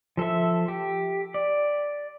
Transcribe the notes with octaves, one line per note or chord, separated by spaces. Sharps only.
F3 A4 C5 E5
G4
D5